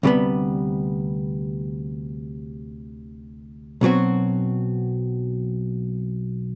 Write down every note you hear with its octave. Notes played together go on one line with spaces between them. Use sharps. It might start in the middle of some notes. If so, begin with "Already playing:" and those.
D2 C3 G3 B3
B1 B2 F#3 C4 F#4